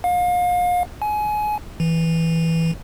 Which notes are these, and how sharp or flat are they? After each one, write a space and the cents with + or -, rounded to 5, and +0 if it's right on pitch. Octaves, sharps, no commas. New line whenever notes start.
F5 +35
G#5 +25
E3 -5